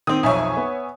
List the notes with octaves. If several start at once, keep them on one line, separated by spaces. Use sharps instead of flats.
D#3 C4 D#6
B1 F2 C#5 E5 G#5
B3